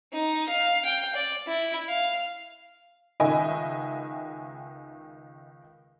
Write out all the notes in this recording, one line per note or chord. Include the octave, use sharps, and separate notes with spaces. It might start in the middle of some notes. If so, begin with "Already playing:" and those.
D#4
F5
G5
D5
E4
F5
C#2 D#3 D#5 E5 G#5